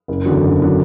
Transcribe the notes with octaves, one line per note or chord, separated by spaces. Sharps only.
F#1
E2 D3 F#3
F#1
D3 F#3